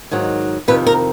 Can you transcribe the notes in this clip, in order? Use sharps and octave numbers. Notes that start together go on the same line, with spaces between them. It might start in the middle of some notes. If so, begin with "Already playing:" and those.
G#2 D#3 F#3
F2 C3 D#3 B4
A#4